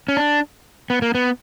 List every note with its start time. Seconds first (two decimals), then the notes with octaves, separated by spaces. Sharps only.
0.08 C#4
0.17 D4
0.90 B3
1.02 A#3
1.15 B3